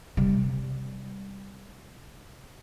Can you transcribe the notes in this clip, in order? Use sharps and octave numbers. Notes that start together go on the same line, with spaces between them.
C3 G3